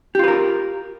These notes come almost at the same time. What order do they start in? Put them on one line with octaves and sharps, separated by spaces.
G4 F4 B4 A#4